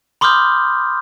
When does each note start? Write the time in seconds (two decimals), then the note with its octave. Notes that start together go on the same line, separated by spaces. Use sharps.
0.21 B5 C6 D6 D#6 F6 G6